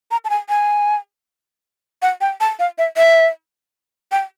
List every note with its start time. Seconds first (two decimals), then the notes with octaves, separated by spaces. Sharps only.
0.11 A#5
0.25 A5
0.30 G#5
0.49 G#5
2.02 F#5
2.21 G5
2.41 A5
2.59 F5
2.78 E5
2.97 E5
4.12 G5